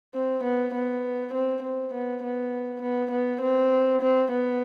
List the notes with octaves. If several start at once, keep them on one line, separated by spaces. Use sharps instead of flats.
C4
B3
B3
C4
C4
B3
B3
B3
B3
C4
C4
B3